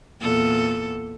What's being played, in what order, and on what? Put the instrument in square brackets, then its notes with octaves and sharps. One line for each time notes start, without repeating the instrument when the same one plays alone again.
[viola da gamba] E2 A#2 A4